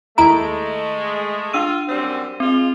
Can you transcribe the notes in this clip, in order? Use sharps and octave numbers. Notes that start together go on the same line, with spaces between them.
D#2 G#3 A3 E4 A#5 D7
D4 F4 E6 D#7
F#2 G3 C4
G#3 C4 F4